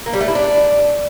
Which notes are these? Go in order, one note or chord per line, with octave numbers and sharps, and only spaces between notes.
A#3
G3
A3
E4
D4